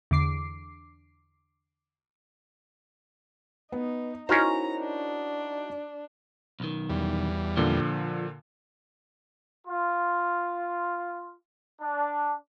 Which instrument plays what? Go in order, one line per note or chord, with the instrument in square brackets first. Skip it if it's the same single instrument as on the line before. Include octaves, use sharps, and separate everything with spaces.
[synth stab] E2 D3 D6 C7
[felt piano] B3 [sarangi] D#4
[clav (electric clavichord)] C#4 A#4 C5 [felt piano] D#4 E4 F#4 [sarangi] A#5
[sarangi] D4
[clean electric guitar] B1 D#3
[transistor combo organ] E2 G3
[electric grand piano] A#2 D3 [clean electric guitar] F3
[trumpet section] F4
D4